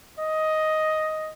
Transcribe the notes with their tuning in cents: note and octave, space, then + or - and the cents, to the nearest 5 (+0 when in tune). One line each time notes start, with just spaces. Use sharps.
D#5 +5